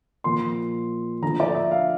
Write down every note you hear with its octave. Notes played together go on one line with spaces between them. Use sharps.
A#2 F3 A#3 F4 C6
D3 F3 A3 D4 A#5
D5
E5
F5